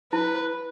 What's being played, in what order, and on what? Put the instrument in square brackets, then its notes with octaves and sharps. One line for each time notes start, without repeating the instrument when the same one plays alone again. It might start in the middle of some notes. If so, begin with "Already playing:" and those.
[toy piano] E4 [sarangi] B4